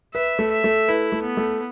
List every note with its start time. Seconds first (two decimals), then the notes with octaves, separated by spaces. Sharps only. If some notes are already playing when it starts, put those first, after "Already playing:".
0.14 B4 E5
0.39 A3
0.51 E5
0.64 A3
0.88 E4 B4
1.12 A3
1.24 B3
1.37 A3